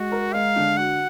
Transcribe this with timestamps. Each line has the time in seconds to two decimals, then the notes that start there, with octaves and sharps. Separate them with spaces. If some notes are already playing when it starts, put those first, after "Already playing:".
Already playing: G#3 F#4
0.12 A#4
0.33 G#3 F5
0.56 D3
0.77 F#4 F#5